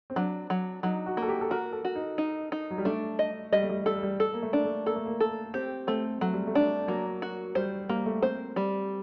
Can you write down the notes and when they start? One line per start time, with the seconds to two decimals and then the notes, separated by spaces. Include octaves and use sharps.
0.10 C4
0.16 F#3 D4
0.50 F#3
0.83 F#3 D#4
1.06 F#4
1.17 A#3
1.22 A4
1.28 G4
1.41 A4
1.50 F#4 A#4
1.73 A4
1.85 F#4
1.95 D#4
2.18 D#4
2.52 D#4
2.70 F#3
2.78 G3
2.85 A3 D4
3.19 D#5
3.52 G3 D#5
3.63 A3
3.69 G3
3.86 G3 A4
4.03 G3
4.20 A4
4.33 A#3
4.43 A3
4.53 D4
4.64 A3
4.86 A#3 A4
4.96 A3
5.05 A#3
5.20 A4
5.54 C4 G4
5.87 A3 C4
6.21 F#3 A3
6.34 G3
6.47 A3
6.55 D4
6.88 F#3 A#3
7.22 F#4
7.55 G3 C5
7.89 G3 A#3
8.06 A3
8.23 C4 C5
8.56 G3